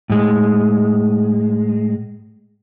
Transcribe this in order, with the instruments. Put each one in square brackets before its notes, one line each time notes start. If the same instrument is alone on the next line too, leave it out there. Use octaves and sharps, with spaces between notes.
[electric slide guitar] A2 G#3